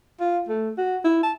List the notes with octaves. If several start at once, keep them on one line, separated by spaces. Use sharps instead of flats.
F4
A3
F#4
E4
A5